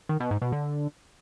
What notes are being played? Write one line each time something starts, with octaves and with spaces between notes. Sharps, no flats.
D#3
B2
G#2
B2
D3